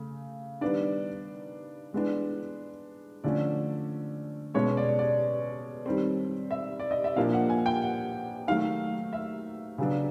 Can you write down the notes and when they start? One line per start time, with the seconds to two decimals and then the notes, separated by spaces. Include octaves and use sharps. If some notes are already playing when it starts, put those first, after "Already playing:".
Already playing: C#3 A3
0.61 D#3 G3 B3 D4 D5
1.93 E3 G#3 B3 D4
3.24 D3 F3 A3 C#4 D5
4.54 B2 G#3 C#4 C#5
4.77 D5
4.99 D5
5.86 D#3 G3 C4
6.51 E5
6.79 D5
6.91 D#5
7.04 E5
7.16 A#2 F3 A#3 D4 F5
7.33 F#5
7.49 G#5
7.66 G5
7.82 F#5
8.48 D#3 F#3 A3 F5
9.13 E5
9.78 C#3 F#3 B3 D4